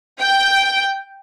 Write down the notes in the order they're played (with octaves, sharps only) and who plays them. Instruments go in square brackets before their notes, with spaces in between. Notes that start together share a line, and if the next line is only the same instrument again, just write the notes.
[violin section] G5